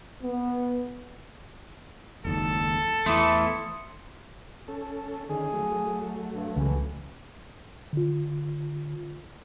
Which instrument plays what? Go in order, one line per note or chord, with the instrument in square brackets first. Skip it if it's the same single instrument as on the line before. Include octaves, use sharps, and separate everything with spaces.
[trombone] B3
[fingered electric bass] F#1 D#2 G#2 [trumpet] A4
[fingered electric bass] E2 [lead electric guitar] E3 A3 [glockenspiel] C6 D#6 C#7
[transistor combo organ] C#4 A4
[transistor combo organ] D3 D#3 C#4 [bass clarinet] G#4
[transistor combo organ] F#3 A3
[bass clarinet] G2
[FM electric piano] C#2 C#3 [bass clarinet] E3
[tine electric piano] D3 F4